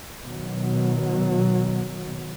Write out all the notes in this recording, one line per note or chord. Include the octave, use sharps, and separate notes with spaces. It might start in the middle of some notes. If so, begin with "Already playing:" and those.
B2 D#3 F#3